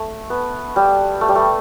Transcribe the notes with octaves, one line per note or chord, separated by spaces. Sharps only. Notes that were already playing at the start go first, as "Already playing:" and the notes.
Already playing: A3
B3
G3
A3
G3
A3